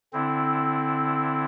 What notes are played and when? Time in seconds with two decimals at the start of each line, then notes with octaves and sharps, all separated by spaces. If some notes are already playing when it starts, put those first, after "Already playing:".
0.13 D3 C4 E4